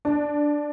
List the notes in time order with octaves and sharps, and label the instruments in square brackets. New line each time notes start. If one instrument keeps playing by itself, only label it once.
[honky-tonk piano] D4